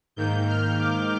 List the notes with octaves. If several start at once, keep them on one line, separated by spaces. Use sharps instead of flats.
G#2 D#3 A#3 G6
F6
D6